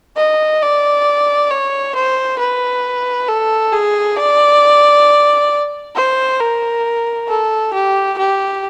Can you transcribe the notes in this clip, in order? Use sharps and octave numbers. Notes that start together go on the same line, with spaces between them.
D#5
D5
C#5
C5
B4
A4
G#4
D5
C5
A#4
A4
G4
G4